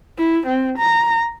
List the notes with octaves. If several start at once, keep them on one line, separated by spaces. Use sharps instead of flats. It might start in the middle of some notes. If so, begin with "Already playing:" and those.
E4
C4
A#5